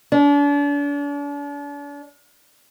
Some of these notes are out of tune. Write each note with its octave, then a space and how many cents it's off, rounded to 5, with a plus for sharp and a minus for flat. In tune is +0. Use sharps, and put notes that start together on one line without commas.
D4 -40